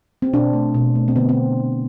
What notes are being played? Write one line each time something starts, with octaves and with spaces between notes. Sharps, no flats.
C4
B2 D4
A3
B2
A3
C4
D3 B3
C4